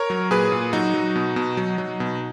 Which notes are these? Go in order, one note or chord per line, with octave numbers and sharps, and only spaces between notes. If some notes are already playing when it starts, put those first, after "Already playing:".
Already playing: A#4 C#5
F#3
A#2 G#4 B4
A#2
F#3 D#4 F#4
F#3
B2
B2
F#3
F#3
B2